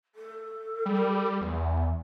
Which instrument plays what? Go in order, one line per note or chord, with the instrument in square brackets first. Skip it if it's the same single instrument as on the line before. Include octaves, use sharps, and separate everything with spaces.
[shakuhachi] A4
[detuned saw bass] G3
E2